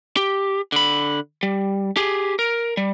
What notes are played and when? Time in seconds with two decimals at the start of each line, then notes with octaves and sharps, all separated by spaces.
0.17 G4
0.72 D3 B5
1.43 G3
1.97 G4 G#4
2.39 A#4
2.77 G3